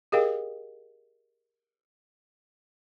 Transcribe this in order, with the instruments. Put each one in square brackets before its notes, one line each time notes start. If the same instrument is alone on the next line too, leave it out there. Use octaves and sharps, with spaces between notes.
[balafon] G4 G#4 A#4 D#5 F5 G5